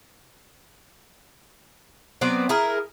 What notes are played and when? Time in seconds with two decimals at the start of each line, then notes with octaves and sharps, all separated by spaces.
2.21 F#3 B3 C4 D5
2.49 E4 G#4 A#4